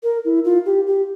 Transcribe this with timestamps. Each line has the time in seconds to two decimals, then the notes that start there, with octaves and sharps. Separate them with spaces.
0.03 A#4
0.25 E4
0.44 F4
0.66 G4
0.87 G4